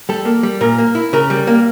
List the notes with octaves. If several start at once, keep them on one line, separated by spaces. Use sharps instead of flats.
G3 A4
A#3
G3
A#2 A#4
A#3
E4
C#3 A#4
G3
A#3